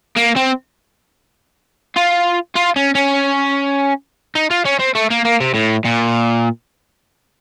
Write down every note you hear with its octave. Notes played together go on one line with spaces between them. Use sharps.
A#3
C4
F4
F4
C#4
C#4
D#4
F4
C#4
C4
A3
A#3
A#3
C3
A2
A#2